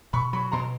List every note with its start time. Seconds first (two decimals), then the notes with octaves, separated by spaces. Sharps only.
0.13 B2 B5 C#6
0.33 F#3 B5 C#6
0.52 B2 A#5 C6